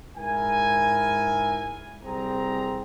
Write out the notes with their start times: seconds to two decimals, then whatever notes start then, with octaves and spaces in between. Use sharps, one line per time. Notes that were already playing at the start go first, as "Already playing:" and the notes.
0.17 G#2 E4 A#4 G#5
2.04 C2 C4 G#4 A#5